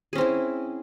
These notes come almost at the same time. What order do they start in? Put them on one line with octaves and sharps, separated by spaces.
G#4 C#4 C4 E4